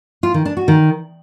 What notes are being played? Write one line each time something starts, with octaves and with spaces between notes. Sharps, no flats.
F4
D#3
D4
F#4
D#3